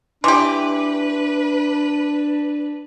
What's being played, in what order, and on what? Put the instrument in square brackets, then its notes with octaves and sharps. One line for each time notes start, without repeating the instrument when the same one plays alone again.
[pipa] E3 G4 [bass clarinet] D4 [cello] B4 [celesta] C6 D6